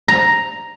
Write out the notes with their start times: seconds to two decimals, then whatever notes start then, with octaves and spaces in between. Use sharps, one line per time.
0.08 A#5